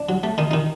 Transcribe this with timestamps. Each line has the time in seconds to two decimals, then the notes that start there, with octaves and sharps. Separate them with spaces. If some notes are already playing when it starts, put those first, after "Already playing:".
Already playing: D4
0.09 F#3
0.23 A3
0.38 D#3 D#4
0.51 D#3 D#4